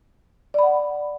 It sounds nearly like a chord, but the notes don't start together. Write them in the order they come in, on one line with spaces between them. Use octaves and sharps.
D5 B5 F#5